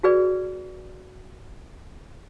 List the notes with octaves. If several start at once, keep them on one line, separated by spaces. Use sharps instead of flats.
F#4 G#4 B4 D5